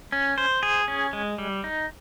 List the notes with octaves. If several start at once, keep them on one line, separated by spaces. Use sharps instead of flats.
C#4
C5
G#4
C#4
G#3
G3
D#4